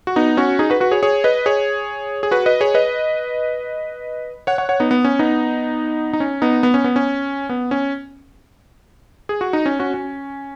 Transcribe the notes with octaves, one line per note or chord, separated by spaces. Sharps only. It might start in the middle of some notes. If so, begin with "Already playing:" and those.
F#4
B3 D#4
C#4 F#4
D#4 G#4
F#4 B4
F#4 B4
G#4 C#5
G#4 C#5
B4 D#5
G#4 C#5
G#4
F#4 B4
B4 D#5
G#4 C#5
B4 D#5
C#5 F#5
C#5 F#5
C#5 F#5
B3 D#4
B3
C#4
B3 D#4
D#4
C#4
B3 D#4
B3
C#4
B3
C#4
B3
C#4
G#4
F#4
D#4
C#4
C#4 F#4
C#4